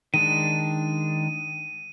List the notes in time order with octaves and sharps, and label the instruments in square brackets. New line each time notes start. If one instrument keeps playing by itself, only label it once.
[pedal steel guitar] D#3 G#3 D4 [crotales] D#7